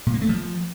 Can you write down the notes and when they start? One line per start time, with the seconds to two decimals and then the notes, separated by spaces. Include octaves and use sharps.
0.07 A#2
0.14 A#3
0.22 A3
0.29 F3